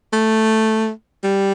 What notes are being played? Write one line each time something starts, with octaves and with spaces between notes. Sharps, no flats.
A3
G3